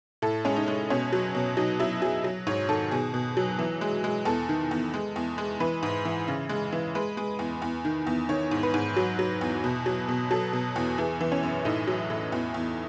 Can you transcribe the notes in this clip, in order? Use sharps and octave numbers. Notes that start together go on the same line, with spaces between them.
A2 A4
G#3 C#4
D#4
G#3
B2 C#4
F#3
B2
F#3 D#4
F#3 E4
F#3 G#4
F#3
G#2 C#5
D#3 A4
B2 G#4
B2
F#3
E3
G#3
G#3
E2 A4
D#3
E2
G#3
E2
G#3
E3 B4
G#2
E3
C#3
G#3
E3
G#3 B4
G#3
E2
E2
D#3
E2
D#3 C#5
G#2
B4
G#2
F#3
F#3
E2
B2
F#3
B2
F#3 A4
B2
E2
E3 G#4
E3
C#4
F#2
A2 D#4
F#3
A2
E2
E2